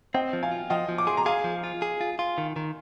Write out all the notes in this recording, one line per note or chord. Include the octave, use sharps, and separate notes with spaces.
C4 D#5 G5
F3
F5 G#5
F4
F3 D#5 G5
F3
D6
G#4 C6
A#5
G#4 F5 G#5
F3
F4
G#4
F4
F4
D#3
D#3